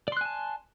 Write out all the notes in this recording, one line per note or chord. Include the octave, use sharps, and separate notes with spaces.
D5 G#5 A5 C6 F#6